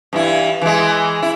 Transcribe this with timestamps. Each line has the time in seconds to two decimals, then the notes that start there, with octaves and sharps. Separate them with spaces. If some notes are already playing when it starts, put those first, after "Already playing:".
0.13 G2 E3 E4
0.62 E3 G#3
1.23 E4